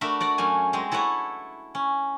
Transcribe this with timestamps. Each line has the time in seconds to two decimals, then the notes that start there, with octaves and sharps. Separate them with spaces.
0.01 A3 D4 F#4 A#4 E5 B5
0.20 F#4 D5 F#5
0.38 F#2 A3 C#4 G#5
0.73 G#3 C4 D#5
0.91 E4 A4 B4 C#5 F#5
1.75 C#4